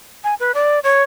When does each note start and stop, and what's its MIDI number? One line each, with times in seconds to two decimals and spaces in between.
0.24 0.35 80
0.40 0.52 71
0.54 0.80 74
0.84 1.03 73